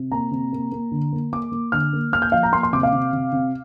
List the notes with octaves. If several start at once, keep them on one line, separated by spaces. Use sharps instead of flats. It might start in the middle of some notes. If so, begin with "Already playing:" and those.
Already playing: C3
A#3 A#5
C3
A#3
A#3
D3
A#3
A#3 D6
A#3
D3 F6
A#3
A#3 F6
G6
F3 F5
A#5
A#3 C6
C6
C3 D6
F5
C3
C3
C3